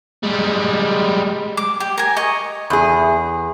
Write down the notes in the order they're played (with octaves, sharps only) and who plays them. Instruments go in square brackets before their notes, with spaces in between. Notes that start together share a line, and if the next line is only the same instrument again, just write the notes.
[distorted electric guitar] G3 G#3
[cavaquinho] D6
G4
A#4 G#5
D#5 A#5 C#6
[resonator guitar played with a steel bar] E2 G#4